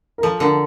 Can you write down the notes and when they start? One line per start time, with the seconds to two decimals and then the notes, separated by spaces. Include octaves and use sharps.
0.18 A#4
0.23 F3 A4
0.40 D3 A#4